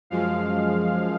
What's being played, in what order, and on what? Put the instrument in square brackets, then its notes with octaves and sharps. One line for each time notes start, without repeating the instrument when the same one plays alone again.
[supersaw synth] F#2 F3 G#3 F5